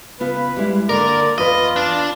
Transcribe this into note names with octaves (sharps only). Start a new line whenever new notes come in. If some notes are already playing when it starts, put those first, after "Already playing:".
C#3 B3 F4 B4
G3 G#3 E4
D3 A#3 A#4 D5
E2 F4 B4 D#5
D4